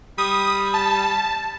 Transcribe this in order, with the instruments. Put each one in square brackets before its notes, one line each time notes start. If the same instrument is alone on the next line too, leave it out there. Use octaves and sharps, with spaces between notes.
[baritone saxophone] G3 [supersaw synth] D#6
[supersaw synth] A5